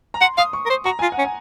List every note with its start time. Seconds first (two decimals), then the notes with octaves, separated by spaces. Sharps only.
0.14 A#5
0.21 F#5 C6
0.38 F5 D#6
0.53 C#6
0.66 A#4
0.70 C5
0.85 F#4 A#5
0.99 F4 G#5
1.12 F#5
1.18 C#4
1.25 G#5